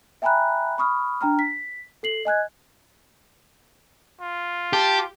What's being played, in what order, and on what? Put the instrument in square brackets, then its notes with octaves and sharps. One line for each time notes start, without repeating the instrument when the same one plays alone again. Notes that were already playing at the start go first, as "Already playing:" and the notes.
[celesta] E5 G5 G#5 A#5 B5 F#6
B5 C#6 D#6 F6
D4 G5 A#5 F6
B6
A4 C7 F#7
D#5 G#5 F#6 G#6
[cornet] F4
[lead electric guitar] G4 [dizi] A5